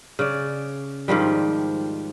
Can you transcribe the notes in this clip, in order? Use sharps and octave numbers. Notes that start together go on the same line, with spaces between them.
C#3 D5
G#2 D#3 F3 G3